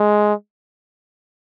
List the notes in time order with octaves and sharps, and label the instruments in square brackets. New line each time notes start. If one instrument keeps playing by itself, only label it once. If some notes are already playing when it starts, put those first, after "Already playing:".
Already playing: [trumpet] G#3